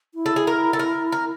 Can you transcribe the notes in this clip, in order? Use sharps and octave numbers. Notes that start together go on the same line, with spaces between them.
E4
A4
G#4
A#4
A4
A#4
A#4